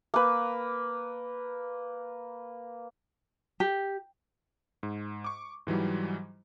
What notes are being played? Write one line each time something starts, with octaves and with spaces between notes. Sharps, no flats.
A#3 B4
G4
G#2
C#6 D6
G#2 E3 F#3 G3